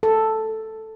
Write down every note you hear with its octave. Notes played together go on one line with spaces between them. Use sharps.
A4